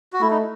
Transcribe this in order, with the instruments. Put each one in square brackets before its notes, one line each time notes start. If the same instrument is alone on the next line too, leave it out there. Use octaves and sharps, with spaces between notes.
[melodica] F#4
[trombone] A3 [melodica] E4
[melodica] D#4